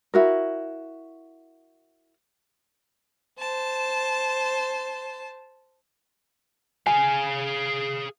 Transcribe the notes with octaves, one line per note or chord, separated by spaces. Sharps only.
E4 F#4 A#4
C5 A5
G#4 F5 G#5